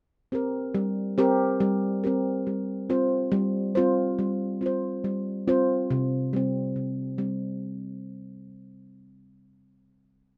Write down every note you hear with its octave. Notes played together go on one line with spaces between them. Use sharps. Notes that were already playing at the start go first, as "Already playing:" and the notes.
C4 G4 A#4
G3
C4 G4 A#4
G3
C4 G4 A#4
G3
C4 F4 C5
G3
C4 F4 C5
G3
C4 F4 C5
G3
C4 F4 C5
C3
G3 C4
C3
G3 C4